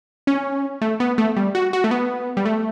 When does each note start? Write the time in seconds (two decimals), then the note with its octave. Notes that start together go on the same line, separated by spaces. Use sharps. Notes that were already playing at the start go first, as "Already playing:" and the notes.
0.27 C#4
0.82 A3
1.00 B3
1.18 A3
1.37 G3
1.55 F#4
1.73 F#4
1.84 A3
1.91 B3
2.37 G3
2.45 A3